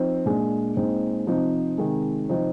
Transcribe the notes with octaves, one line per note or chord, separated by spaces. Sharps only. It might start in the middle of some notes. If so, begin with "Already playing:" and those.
Already playing: F3 C4 D#4
A#2 G#3 D4
A#2 G#3 C4 D#4
C3 F3 C4 D#4
C3 D#3 G#3
C3 F3 C4 D#4